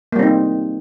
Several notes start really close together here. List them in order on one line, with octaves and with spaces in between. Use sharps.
A#3 G3 C4 D#4